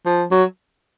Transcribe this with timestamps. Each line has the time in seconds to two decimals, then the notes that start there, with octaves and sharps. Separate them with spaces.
0.06 F3
0.31 F#3